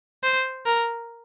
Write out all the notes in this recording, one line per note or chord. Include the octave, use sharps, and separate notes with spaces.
C5
A#4